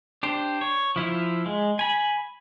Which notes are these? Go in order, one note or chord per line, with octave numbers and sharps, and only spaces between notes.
D4 G4 C5
C#5
F3 E4 F4
G#3
G#5 B5